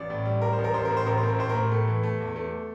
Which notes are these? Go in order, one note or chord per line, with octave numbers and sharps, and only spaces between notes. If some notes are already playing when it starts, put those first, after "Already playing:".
Already playing: A1 D5
A2
G3
G3 A#4
C5
A1
A#4
A1 C5
A#4
A2
C5
A1 A#4
A2 C5
A#4
A2 C5
A#4
A2
A3
E3
A3
E2
A3